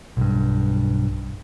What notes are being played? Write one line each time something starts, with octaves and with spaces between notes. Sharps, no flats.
B1 G2